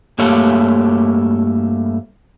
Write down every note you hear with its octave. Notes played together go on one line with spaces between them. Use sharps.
G2 A3 A#3 G4 C#5